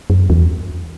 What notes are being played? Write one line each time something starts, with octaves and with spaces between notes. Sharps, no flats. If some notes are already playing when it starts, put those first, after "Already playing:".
F#2
E2